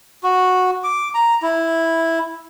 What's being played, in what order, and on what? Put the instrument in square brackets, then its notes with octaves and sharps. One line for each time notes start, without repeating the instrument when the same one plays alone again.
[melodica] F#4
D6
A#5
E4